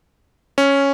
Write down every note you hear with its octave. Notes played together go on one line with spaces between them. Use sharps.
C#4